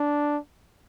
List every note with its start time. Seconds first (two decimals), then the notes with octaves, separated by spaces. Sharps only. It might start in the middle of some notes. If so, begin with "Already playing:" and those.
Already playing: D4